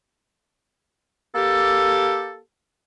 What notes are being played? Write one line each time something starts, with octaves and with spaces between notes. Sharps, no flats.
A#3 G4 A4